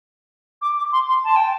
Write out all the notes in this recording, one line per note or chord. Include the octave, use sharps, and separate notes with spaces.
D6
D6
C6
C6
A5
G5